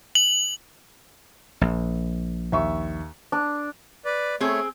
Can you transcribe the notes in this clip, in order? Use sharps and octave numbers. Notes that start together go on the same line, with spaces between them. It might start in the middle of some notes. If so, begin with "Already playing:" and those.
F#7
A#1
D#2 E5 C#6
D4
B4 D5
A3 C4 G#4 C#5